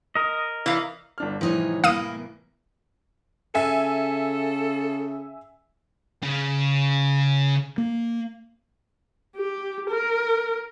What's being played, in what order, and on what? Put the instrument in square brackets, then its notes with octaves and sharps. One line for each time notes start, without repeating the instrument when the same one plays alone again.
[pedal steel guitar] A#4 D#5
[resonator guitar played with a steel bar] E3 F5
[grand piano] G1 D4 F6
[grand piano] C2 A2 E3 [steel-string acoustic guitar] F3 D#4 C#5
[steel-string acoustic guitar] A#3 E4 [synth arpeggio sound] F5 D#6 D#7
[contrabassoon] C#3 [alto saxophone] A4 [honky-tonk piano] E5 G#5
[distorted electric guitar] C#3
[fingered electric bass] A#3
[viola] G4
A#4